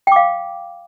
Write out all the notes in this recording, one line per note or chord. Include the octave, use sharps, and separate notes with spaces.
F5 G5 D6